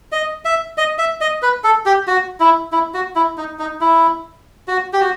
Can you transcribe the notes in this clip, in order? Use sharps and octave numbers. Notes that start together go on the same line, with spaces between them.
D#5
E5
D#5
E5
D#5
B4
A4
G4
F#4
E4
E4
F#4
E4
D#4
D#4
E4
F#4
G4
F#4